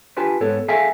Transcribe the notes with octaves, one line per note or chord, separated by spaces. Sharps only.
D4 F4 G4 B4 G#5 A5
G#2 B3 A4 C#5
G#4 A4 E5 F5 G#5